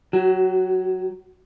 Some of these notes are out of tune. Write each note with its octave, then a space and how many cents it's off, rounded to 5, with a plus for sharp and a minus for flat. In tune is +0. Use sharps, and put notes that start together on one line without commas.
F#3 +0 F#4 +30